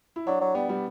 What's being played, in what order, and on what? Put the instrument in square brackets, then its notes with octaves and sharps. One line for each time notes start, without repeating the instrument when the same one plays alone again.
[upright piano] E4
[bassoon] F#3 [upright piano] D4
[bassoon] F#3
[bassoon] G3 [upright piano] B3
[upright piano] G3